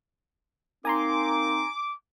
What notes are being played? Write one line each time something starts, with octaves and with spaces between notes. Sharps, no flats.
A#3 C4 D#4 G#5 A#5 C6 D6